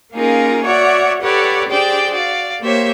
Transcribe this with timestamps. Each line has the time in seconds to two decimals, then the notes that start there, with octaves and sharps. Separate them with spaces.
0.12 A#3 C#4 D#4 F4 G#4 A#4
0.64 F#4 C#5 D5 E5 F#5
1.22 G4 A4 B4 C#5 D5 F#5
1.69 D4 G4 G#4 C5 D5 G5
2.13 F#4 D5 F5
2.60 A#3 G4 C5 C#5 E5